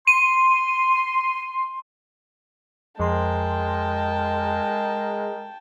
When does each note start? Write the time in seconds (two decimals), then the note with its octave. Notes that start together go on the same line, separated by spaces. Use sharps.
0.07 C6 D#7
3.00 F2 G#3 A#4 G5 A5 C6